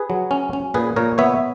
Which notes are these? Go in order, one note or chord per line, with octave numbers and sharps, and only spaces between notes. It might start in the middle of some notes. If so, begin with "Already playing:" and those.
Already playing: G#4 B4
F#3
C#4
C#4
A#2 G#4 B4
A#2 A#4 C#5
B3 C#5 E5